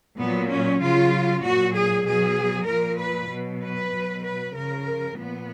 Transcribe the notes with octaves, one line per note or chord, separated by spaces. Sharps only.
A#2 F#3 B3
C#4
C#3 F#3 F4
A#2 F#3 F#4
G#4
B2 F#3 G#4
A#2 F3 A#4
B4
B2 F#3
B4
B2 F#3
B4
C#3 F3 A#4
A#2 F3 B3